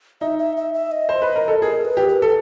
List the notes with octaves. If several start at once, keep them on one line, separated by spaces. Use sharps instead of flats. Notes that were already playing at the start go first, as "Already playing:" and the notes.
D#4 E5
E5
E5
E5
D#5
C5
B4
A#4
A4
G#4 A#4
B4
G4
B4
A4